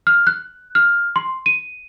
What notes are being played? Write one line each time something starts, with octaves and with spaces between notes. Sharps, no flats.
F6
F#6
F6
C6
D#7